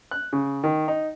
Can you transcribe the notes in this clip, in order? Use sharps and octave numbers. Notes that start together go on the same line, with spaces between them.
F#6
C#3
D#3
D#4